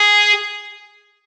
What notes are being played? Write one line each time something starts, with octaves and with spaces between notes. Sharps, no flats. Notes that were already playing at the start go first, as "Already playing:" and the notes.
Already playing: G#4